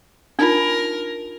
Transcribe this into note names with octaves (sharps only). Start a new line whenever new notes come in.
D4 D#4 F4 A#4